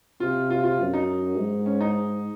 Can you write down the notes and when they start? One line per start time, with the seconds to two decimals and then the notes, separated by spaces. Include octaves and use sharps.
0.20 C3 F4
0.50 F4
0.64 F4
0.79 F#2
0.94 D#4
1.37 G#2
1.66 C#4
1.81 D#4